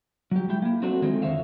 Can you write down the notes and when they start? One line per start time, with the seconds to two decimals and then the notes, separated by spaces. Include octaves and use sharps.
0.31 F#3 G4
0.49 G#3 E4 G5
0.62 A#3 E4
0.82 F#3 A3 C4 D4 F#4
1.02 D#3 F3 G#3 A3 C4
1.22 F2 D3 C5 C#5 E5 F5